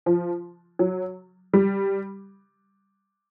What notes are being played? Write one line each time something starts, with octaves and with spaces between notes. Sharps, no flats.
F3
F#3
G3